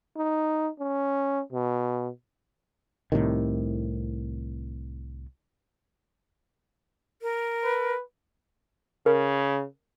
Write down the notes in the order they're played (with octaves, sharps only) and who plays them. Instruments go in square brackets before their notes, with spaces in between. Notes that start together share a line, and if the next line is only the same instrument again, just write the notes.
[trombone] D#4
C#4
B2
[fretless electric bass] C2 A2 C3 D#3
[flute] A#4
[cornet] B4
[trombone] C#3 [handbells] A#4